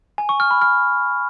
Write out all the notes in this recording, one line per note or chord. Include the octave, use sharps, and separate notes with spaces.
G#5
C#6
F6
B5
F6